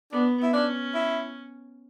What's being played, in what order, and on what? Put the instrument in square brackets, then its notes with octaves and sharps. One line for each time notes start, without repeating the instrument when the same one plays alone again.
[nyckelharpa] B3 [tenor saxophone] D4
[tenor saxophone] E4
[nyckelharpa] C#4 [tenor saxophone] D4
[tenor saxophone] E4